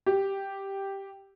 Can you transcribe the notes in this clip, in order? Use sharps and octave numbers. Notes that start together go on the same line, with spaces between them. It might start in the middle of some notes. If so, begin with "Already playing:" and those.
G4